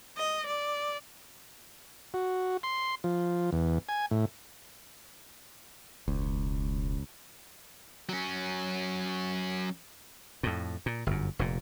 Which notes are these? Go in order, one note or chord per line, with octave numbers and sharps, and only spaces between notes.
D#5
D5
F#4
C6
F3
E2
G#5
A2
E1 C#2
F#3 C#4
F2 A2
A#2
G1 F#2
F1 A#2